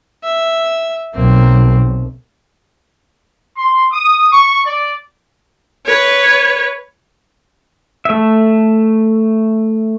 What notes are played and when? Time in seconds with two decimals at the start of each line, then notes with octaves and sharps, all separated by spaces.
0.24 E5
1.14 B1 A#3 C4
3.57 C6
3.92 D#6
4.32 C#6
4.65 D5
5.86 B4 C#5
8.05 A3 E5